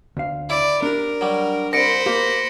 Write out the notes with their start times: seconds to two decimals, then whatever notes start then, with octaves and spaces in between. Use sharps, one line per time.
0.17 D2 F5
0.50 E4 D5 D6
0.83 D4 G4 A#4
1.21 F#3 G3
1.73 C2 C5 B5 A#6 C#7 D7
2.06 A#3 G4